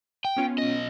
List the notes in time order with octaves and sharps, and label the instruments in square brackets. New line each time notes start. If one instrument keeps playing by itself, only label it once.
[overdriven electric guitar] G5
[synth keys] B3 C#4 F4
[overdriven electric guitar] B1 D#5